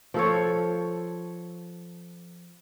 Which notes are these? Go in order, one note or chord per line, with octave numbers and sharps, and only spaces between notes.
F3 A4 C#5